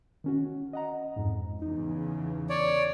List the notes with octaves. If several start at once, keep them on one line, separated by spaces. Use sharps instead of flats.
D#3 C#4 F#4
D#5 F#5 A#5
F2 G#2
E2 C#3 D#4
C#5 D5